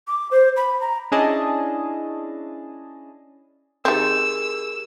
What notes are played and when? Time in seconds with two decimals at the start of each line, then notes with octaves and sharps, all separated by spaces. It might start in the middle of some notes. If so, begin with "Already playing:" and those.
0.08 D6
0.31 C5
0.57 B5
0.81 A#5
1.12 C#4 D4 E4 G#4 D#5 A5
3.85 D#3 C4 G4 G#4 A#4 E6